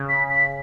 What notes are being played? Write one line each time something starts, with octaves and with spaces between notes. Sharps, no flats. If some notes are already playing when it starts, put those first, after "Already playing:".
Already playing: C#3
B6
B6